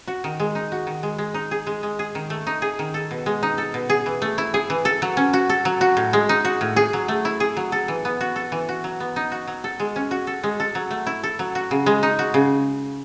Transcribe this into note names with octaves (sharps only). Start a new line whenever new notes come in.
F#4
D#3
G#3
D#4
F#4
D#3
G#3
G#3
D#4
G#4
G#3
G#3
G#4
D#3
A3
D#4
G#4
D#3
A4
B2
G#3
D#4
A4
B2
G#4
E3
A3
E4
G#4
E3
A4
F#3
C#4
F#4
A4
F#3
F#4
A2
G#3
D#4
F#4
A2
G#4
F#3
A3
E4
G#4
F#3
A4
E3
B3
F#4
A4
E3
F#4
F#3
B3
D#4
F#4
F#3
A4
G#3
C#4
F#4
A4
G#3
A4
F#3
A3
E4
A4
F#3
F#4
C#3
G#3
D#4
F#4
C#3